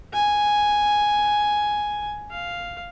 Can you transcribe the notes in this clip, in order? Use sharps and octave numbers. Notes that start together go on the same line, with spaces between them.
G#5
F5